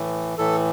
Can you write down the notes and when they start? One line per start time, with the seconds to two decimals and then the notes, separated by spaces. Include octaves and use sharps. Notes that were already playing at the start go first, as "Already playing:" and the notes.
Already playing: A2 E3
0.38 A2 E3 A4